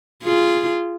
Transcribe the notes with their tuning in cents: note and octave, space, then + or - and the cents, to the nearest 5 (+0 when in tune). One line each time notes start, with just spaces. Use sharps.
F4 -10 G#4 +0